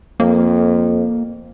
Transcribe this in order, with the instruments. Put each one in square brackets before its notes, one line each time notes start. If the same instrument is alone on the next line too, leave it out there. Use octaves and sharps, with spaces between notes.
[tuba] F2 [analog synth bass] A#3